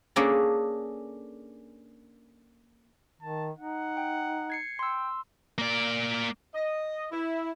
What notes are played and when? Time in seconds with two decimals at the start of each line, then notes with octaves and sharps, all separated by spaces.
0.16 A#3 C#4 D4 G#4 A4
3.22 D#3 A5
3.59 D#4 F#5
3.97 G5
4.50 G#6 C7 C#7
4.79 G5 C6 E6
5.58 A#3 D5
6.54 D#5
7.12 E4